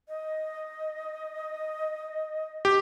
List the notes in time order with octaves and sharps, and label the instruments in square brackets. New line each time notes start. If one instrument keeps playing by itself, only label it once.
[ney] D#5
[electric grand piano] G4